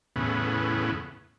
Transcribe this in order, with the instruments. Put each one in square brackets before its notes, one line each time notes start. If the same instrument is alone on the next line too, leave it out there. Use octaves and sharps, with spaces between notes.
[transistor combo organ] E2 A2 C#3 B3